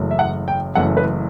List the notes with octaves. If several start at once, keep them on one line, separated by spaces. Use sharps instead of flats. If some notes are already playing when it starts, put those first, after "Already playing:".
Already playing: F#1 F#2 E3 A3
E5
F#5
G5
F#1 F#2 E3 A3 F#5
B4